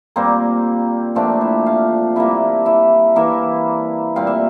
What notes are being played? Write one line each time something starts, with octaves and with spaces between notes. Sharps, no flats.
A#2 G3 A#3 C4 C5
A#2 F3 A3 C4 D4 D5
E4 E5
F4 F5
C3 G3 A#3 E4 E5
E4 E5
E3 A#3 E4 E5
A#2 G3 C4 F5
E5